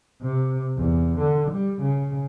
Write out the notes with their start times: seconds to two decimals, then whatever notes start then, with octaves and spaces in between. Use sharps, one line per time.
0.22 C3
0.77 E2
1.19 D3
1.51 G3
1.82 C#3